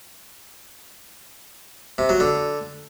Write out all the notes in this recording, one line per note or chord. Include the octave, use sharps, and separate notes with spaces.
C3
F#3
D3